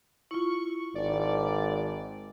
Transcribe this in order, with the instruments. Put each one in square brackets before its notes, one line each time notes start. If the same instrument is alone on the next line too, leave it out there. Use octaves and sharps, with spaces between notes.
[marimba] E4 F4 [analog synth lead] C#6
[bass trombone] G#1 [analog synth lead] D5